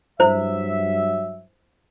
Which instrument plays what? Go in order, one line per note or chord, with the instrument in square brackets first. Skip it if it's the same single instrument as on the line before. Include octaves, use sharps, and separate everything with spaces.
[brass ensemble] G2 F#3 E5 [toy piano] E4 C5